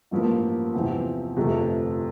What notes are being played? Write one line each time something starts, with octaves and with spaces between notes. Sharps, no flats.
A1 G2 F3 A#3
E2 C3 F3 C4
G1 F2 C3 F3 A3